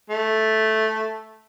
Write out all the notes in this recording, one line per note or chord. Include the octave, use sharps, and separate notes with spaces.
A3